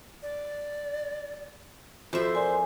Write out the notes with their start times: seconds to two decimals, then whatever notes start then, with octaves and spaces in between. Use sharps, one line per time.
0.22 D5
2.13 F2 F4 F#4 C5 E5
2.35 A#4 D5 G#5 C6